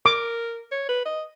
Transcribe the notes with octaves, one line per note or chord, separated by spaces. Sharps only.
A#4 D6
C#5
B4
D#5